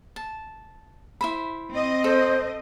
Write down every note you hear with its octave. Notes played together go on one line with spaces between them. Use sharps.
A5
E4 C5 B5
C4 D#5
A4 C5